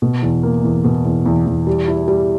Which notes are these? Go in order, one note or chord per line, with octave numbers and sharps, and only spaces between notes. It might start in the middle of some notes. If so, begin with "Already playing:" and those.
B2
E2
A#3
E2
B2
E2
E2
E2
G3
E4
G3